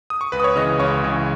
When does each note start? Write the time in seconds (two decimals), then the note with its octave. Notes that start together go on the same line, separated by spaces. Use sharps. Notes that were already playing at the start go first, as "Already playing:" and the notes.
0.10 D#6
0.21 C#6
0.32 C#2 B4 B5
0.40 D#6
0.44 C#5 C#6
0.56 C#3 E3 D#5 D#6
0.79 C#2 C#5 C#6
1.04 C#3 E3